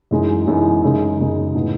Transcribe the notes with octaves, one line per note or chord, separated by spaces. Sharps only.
F#2 E3 G#3 D#4
F#2 E3 G#3 D#4
F#2 C#3 G#3 D#4
F#2 C#3 G#3 D#4
A2 E3 B3 D#4